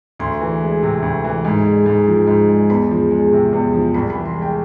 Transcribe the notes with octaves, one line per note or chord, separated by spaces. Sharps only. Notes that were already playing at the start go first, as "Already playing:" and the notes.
D2 C6
E3
G#3
C3
D2
E3
G#2
G#3
G#2
F3
G#2
G#3
E2 B5
F3
G#3
C3
E2
F3
C2 B5
E3 B5
C6
G#3
G5